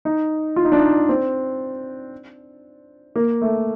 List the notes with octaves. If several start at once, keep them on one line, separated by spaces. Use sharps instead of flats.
D#4
F4
D#4
D4
D#4
C4
A#3
A3